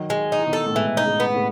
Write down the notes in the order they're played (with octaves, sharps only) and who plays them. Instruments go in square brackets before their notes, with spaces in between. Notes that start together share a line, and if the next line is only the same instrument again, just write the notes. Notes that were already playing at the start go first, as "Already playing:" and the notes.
Already playing: [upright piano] D#3 F#3
[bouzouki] G#3
D#4
[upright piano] E3
B2 D#3
[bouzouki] A4
[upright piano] A2
[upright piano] G#2 B2 [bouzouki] E3
[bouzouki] D#4
[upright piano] A2 C#3
[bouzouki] B3
[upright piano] A2 C#3